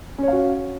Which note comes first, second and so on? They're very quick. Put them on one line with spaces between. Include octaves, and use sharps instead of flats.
C#4 C#5 F5 F#4